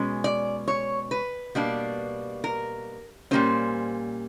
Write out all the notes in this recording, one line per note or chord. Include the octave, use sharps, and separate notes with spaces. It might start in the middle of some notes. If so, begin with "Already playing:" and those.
Already playing: B2 G#3 C#4
D5
C#5
B4
B2 G3 A#3 D4
A#4
A#2 G3 A#3 C#4 C5